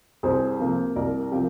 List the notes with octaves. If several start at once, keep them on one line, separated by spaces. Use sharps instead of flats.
C2 G#4 C5
C3 F3 A#3
C2 A#4 D5
C3 F3 G4 A#4